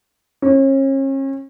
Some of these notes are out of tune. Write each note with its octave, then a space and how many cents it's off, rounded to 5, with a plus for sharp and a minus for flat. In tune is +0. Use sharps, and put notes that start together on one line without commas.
C#4 -40